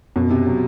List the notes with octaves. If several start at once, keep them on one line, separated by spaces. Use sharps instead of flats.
F#2 B2
C3
F#3